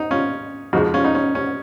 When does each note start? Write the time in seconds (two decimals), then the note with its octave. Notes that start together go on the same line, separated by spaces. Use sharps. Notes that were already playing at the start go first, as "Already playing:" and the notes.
Already playing: D#4
0.11 C#4 F4
0.73 F2 C#3 F3 G#3 D#4 F#4
0.94 C#4 F4
1.04 D#4
1.15 C#4
1.35 C#4